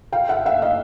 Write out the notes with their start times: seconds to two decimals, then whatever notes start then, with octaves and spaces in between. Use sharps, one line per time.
0.12 F5 G5
0.29 E5 F#5
0.46 E5 F#5
0.62 D#5 F5